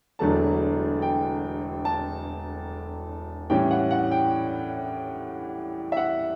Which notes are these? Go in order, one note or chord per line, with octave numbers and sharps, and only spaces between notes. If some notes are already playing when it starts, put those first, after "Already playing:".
E1 E2 D3 F#3 A3 A5
G5
A5
A2 E3 G3 C#4 E4 G5
F#5
F#5
G5
E5
F#5